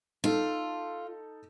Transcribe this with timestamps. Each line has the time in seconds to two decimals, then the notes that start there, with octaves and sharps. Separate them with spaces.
0.24 D#4 F4 A4